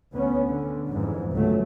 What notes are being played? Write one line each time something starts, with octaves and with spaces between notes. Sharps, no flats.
D2 B3 C#4
D3
F2 G#2 E3
G1 C#2 F#3 A3